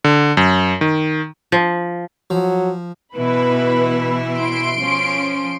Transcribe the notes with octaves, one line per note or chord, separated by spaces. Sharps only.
D3
F#2
D#3
F3
F3 F#3
B2 E3 E4 B4 B5
C6 D7
F3 C#4